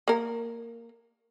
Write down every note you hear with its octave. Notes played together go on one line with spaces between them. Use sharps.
A#3 A#4